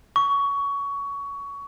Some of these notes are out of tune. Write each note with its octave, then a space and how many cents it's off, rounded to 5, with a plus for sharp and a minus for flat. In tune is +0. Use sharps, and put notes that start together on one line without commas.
C#6 +20